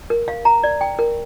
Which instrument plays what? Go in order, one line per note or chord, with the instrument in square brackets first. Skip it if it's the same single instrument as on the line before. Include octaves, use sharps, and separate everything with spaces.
[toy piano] A#4
F5
A#5
D5
G5
A#4